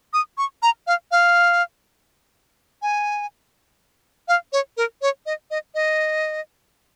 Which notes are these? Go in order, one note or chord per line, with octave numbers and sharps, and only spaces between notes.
D#6
C#6
A#5
F5
F5
G#5
F5
C#5
A#4
C#5
D#5
D#5
D#5